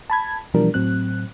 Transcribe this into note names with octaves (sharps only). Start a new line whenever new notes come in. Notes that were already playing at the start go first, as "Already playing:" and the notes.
A5 B5 G#6
B2 E3 F3 G3 D4 A#4
A2 F#3 C4 F#6